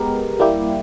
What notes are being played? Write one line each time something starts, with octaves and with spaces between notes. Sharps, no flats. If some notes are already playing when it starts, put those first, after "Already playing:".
Already playing: G#3 B3 G4 A#4
G3 A#3 E4 G4